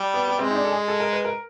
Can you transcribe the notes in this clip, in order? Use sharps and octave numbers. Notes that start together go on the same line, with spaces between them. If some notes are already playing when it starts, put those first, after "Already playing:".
Already playing: G3
B3
B3
G#3 C4
D#4
D4
A4
G#4
A4
A#4
B4
A#4